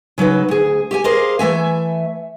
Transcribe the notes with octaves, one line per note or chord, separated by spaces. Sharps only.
C#3 F#3 D#4 B4
D2 G#4
G4 D#5 G#5
G4 G#4 A#4 C5 D#5 F5
E3 A3 E5 G#5